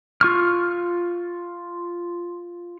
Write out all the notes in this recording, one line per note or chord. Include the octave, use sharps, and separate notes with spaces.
F4 C#6 F6